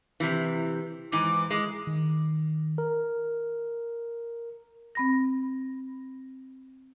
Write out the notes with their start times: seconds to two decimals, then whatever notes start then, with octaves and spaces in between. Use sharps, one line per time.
0.20 C3 E3
1.12 G#2 E3 D6
1.51 G#3
1.87 D#3
2.78 A#4
4.95 C4 B5 A#6